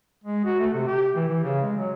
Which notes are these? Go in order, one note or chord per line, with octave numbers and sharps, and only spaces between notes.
G#3
F#4
A3
C3
G4
E3
E3
C#3
G#3
F#3